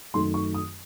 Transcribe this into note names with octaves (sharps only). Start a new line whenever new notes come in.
F#2 D#3 A3 D#4 C6
C#6
D#6